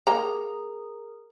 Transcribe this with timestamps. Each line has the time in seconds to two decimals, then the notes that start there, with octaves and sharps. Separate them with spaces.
0.07 A#3 G#4 A#4 A#5